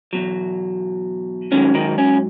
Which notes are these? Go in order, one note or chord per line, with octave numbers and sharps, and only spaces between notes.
E2 B2 F#3
G#2 D#3 F#3 C#4
D#3 D#4
C#4